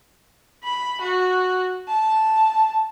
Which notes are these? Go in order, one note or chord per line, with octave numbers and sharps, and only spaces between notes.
B5
F#4
A5